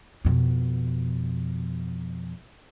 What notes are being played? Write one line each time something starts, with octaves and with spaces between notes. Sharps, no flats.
F2 B2